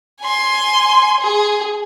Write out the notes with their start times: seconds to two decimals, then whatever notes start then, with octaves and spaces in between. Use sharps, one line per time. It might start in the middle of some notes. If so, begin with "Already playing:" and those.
0.21 G#5 C6
1.20 G#4